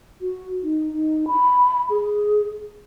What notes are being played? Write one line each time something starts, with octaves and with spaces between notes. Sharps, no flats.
F#4
D#4
D#4
B5
G#4